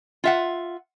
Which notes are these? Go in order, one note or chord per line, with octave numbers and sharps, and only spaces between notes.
F4 E5 F#5